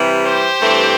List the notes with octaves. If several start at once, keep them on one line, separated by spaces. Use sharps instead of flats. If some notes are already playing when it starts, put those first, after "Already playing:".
Already playing: C3 E3 G3
G4 C5
G2 E3 A3 C4